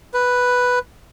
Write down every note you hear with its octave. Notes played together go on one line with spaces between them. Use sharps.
B4